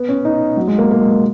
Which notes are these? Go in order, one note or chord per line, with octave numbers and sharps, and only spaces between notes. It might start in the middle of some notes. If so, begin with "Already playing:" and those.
Already playing: B3
C#4
D#4
F#3
G#3
A#3
A#3
G#3
A#3